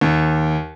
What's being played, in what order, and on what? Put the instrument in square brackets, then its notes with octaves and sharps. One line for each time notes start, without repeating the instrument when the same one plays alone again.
[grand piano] D#2